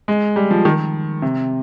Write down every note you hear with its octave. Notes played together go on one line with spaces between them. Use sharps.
G#3
G3
F3
D#3
C3